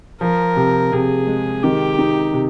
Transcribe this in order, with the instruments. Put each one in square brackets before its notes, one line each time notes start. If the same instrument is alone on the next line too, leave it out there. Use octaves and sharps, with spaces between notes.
[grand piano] F3 [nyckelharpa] A#4
[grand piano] C3
[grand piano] C3 [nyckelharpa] G#4
[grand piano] G#3
[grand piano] D#3 [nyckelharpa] G4
[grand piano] D#4
C3